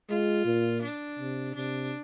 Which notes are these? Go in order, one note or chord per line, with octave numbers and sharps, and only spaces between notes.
G#3 F4
A#2
D4
C3
C3 D4